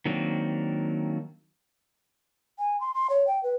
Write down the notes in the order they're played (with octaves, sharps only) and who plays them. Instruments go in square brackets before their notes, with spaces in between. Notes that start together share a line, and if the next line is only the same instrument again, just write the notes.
[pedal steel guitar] D#3 F#3 A#3 C4 D4
[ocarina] G#5
C6
C6
C#5
G5
B4